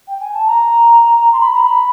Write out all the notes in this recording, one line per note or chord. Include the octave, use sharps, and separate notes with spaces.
G5
G#5
A5
A#5
C6
B5
A#5
B5